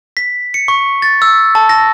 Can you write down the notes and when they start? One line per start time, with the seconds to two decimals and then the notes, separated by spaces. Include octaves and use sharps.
0.17 B6
0.54 C#7
0.68 C#6
1.02 A6
1.22 E6
1.55 A5
1.69 A#6